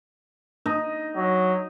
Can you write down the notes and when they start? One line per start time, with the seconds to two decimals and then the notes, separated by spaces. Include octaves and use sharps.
0.66 D#4
1.16 F#3